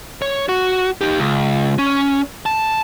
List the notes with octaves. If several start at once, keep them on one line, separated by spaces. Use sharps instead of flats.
C#5
F#4
D#4 G4
C#2
C#4
A5